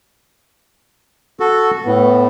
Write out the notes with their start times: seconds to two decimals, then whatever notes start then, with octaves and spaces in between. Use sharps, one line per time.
1.40 F#4 A4
1.86 A2 B3